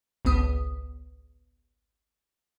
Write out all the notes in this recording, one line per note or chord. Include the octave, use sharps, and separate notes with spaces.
G#1 C#2 B3 D#6